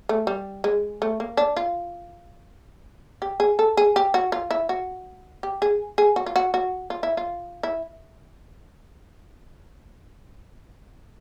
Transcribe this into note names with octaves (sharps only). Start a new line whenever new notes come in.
A3
G3
G#3
A3
A#3
D4
F4
G4
G#4
A4
G#4
G4
F#4
F4
E4
F#4
G4
G#4
G#4
F#4
F4
F#4
F#4
F4
E4
F4
E4